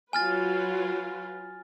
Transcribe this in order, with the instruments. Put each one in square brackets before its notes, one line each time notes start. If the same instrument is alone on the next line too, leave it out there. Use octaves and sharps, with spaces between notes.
[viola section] F#3 F4 B4 [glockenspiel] G#5 F6 A6